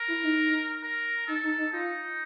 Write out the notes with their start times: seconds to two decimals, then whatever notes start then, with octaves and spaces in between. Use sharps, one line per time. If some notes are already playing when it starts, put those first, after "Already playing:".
Already playing: A#4
0.08 E4
0.23 D#4
0.83 A#4
1.28 D#4 A4
1.44 D#4
1.58 D#4
1.73 D#4 F4